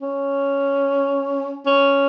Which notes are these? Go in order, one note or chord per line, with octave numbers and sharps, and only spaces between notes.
C#4
C#4